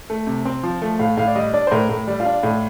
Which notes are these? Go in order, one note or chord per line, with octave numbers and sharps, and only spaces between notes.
A3
C3
C4
F3
A3
A2 F5
A2 F5
D5
G3 D#5
D4 D5
C5
A2 A#4
A2
G3
F4
D4
A2